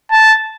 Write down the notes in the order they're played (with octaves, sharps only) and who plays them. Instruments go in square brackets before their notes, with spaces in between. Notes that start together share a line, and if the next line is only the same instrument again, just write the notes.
[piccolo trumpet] A5